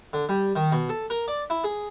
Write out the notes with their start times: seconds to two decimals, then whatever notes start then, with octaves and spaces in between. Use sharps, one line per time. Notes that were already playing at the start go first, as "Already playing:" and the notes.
0.13 D3
0.29 G3
0.56 D#3
0.72 B2
0.89 A4
1.10 A#4
1.28 D5
1.50 E4
1.64 G#4